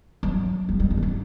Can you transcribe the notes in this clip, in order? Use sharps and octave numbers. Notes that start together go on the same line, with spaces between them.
F#3
G3
G3
G3
E3
F#3